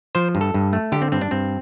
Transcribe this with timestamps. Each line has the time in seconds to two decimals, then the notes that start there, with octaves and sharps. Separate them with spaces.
0.15 F3 C5
0.35 G2
0.41 A4
0.54 G2
0.73 A3
0.92 D3 G4
1.02 C4
1.12 G2 C4
1.21 D4
1.31 G2 C4